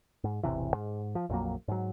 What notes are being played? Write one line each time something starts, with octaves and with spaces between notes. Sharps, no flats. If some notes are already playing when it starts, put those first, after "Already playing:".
G#2
E1 A1 C3 E3
G#2
F3
A#1 F2 F#3 A#3
G#2 F#3